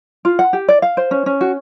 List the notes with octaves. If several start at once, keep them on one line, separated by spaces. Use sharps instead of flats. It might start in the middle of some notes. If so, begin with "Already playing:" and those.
F4
F#5
G4
D5
F5
C5
C#4
C#4
F#4